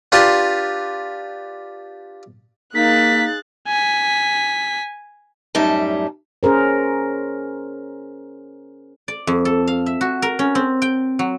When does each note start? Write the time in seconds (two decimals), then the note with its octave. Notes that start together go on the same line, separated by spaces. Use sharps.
0.12 D4 F4 G4 B4 A#5 C6
2.75 A#3 D#4 G#4 F5 F#6 A6 B6
3.67 G#5 B6
5.55 F#2 A2 G3 D#4 E5 A5
6.43 C#4 G#4 A#4 C5
9.08 D5
9.27 F2
9.45 A4
9.67 F5
9.86 E5
10.01 F#4
10.22 A#4
10.39 C#4
10.55 C4
10.82 G5
11.19 F#3